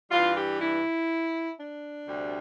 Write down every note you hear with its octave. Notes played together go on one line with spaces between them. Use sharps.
G2 E3 G3 F4
G4
E4
D4
D2 C3 G3